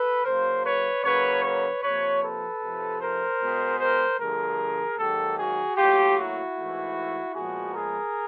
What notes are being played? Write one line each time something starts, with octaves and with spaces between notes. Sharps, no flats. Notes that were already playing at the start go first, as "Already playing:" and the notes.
Already playing: A4 B4
C#3 F#3 A#3 A#4 C5
B4 C#5
F#2 C#3 F#3 A#3 B4 C#5
B4 C#5
C3 F3 A#3 B4 C#5
A4 B4
C3 F3 A3
A#4 C5
B2 G#3 B3
A#4 C5
G2 D3 F3 A3 G#4 A#4
G#2 D#3 F#3 A#3 G4 A4
F#4 G#4
A2 F#3 A#3 F4 G4
E4 F#4
G#2 E3 A3
A#2 F3 G#3 B3 F#4 G#4
G#4 A#4